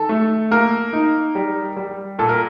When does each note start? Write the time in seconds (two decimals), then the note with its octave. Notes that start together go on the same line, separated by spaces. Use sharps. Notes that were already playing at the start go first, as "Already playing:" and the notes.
Already playing: D#3 A4
0.09 A3
0.51 A#3 A#4
0.93 D#4
1.35 G3
1.77 G3
2.19 A#2 A4
2.29 A#4